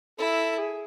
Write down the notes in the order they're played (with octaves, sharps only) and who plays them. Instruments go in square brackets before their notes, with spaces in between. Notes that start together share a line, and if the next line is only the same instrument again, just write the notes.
[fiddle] E4 [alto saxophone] A4
[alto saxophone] G#4